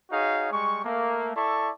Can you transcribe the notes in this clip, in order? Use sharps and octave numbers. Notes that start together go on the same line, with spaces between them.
D#4 F#4 G#4 C#5 F5
G3 G#3 C#6
A3 A#3
E4 A4 D5 A5 C#6